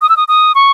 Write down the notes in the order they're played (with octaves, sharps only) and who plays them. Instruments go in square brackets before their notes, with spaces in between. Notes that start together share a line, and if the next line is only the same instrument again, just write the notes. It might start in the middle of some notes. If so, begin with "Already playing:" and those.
[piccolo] D#6
E6
D#6
D#6
C#6